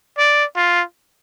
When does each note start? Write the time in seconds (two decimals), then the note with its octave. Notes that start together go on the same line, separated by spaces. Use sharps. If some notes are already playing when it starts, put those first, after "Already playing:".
0.18 D5
0.56 F4